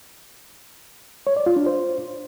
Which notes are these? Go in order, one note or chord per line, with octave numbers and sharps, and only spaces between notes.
C#5
D5
F4
D4
C5